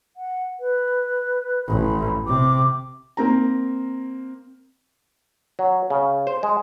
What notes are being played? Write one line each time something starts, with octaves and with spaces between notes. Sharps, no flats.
F#5
B4
A1 B5
C3 D6
A#3 C4 A#5
F#3
C#3
C5
G#3